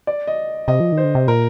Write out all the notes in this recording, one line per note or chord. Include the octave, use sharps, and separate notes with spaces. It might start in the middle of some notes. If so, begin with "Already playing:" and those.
D5
D#5
C3 D#5
F3
D#3
C5
D3
C3
A#2 A#4